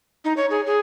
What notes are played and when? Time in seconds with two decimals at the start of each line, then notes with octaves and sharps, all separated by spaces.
0.25 D#4
0.37 C#5
0.50 G#4
0.66 G#4